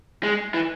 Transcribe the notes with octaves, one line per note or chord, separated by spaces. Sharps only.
G#3
E3